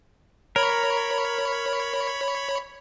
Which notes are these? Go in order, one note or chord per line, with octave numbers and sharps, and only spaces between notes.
A#4 C#5 B5